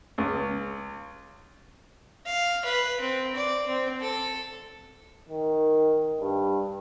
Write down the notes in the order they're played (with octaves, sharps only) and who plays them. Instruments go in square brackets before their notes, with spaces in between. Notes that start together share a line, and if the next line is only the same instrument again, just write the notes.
[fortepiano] C#2
[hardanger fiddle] F5
B4
C4
D5
C4
A4
[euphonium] D#3
G2